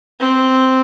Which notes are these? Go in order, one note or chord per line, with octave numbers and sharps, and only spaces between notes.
C4